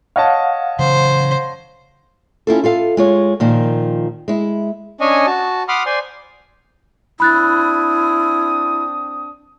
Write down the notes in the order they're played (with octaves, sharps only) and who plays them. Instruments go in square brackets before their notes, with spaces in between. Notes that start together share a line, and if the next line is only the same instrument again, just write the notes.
[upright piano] C#5 D#5 A5 [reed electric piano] F5 F#5
[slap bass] C#3 E3 F#3 [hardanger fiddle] C5
[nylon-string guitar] C#4 E4 F4 A4
F4 A4 F5
G#3 F4 C#5
A#2 D#3 F3
G#3 E4
[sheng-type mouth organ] C#4 D4 C#5 D#5 G#5
F#4 A5
F#5 B5 C6 D6 D#6 F6
C5 D5 G#5 C6
[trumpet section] C4 D4 D#6 [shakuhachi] E4 [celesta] B5 F#6 A6